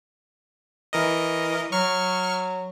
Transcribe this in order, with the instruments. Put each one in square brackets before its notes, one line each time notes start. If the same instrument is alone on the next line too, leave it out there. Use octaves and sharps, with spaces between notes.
[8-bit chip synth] E3 A#4 D#5
[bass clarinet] F#3 [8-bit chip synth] C#6 F6